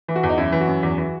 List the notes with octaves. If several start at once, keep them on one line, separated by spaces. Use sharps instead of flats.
E3
F#4
E2
D#4
F#2 E4
E3
F#4
F#2
E2
E3